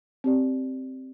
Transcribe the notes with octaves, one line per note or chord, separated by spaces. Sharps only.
C4 G4 D5